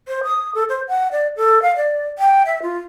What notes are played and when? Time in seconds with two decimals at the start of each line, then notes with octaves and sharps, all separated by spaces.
0.08 C5
0.24 D#6
0.55 A4
0.69 C5
0.88 F#5
1.12 D5
1.37 A4
1.62 F5
1.76 D5
2.19 G5
2.46 E5
2.62 F4